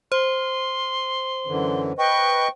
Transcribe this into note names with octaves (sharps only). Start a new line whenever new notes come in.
C5 C6
F#2 D3 E3
B4 D#5 G5 C#6